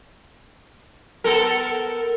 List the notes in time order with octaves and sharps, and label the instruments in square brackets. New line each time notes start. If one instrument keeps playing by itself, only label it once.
[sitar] B3 A4 A#4